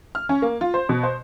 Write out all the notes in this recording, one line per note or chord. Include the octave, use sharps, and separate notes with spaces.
F6
C#4
A#3
F4
C5
B2
C5